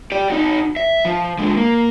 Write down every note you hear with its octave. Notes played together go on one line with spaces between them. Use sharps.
G4 D5
D#4 F#4
E5
F3
D3 G#3
A#3